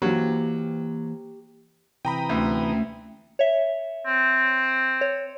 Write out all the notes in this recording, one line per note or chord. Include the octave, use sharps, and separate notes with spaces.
E3 F#3 A#3 G4 C5
C3 E3 G5 A#5 B5 D#6
D2 A3 C#4 E5
C#5 E5
C4
C#5